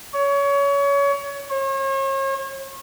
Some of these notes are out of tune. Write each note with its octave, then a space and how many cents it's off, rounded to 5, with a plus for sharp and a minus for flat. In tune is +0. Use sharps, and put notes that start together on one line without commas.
C#5 +25
C#5 -40